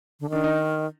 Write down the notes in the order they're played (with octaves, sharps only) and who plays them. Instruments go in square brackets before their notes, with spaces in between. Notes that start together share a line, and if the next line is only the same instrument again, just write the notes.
[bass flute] D3
[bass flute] D#3 [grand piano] D4
[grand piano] D#4